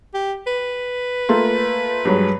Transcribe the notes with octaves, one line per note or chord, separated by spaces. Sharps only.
G4
B4
A3 A#3 F4
G2 F#3 G#3